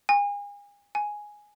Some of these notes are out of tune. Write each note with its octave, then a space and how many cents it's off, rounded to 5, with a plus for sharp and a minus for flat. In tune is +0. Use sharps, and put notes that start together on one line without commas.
G#5 -35
G#5 +0